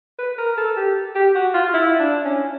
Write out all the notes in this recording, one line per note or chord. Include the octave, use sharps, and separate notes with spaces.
B4
A#4
A4
G4
G4
F#4
F4
E4
D4
C#4